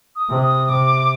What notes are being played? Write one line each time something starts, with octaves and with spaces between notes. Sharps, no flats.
D#6
C3
D#6
C3 D6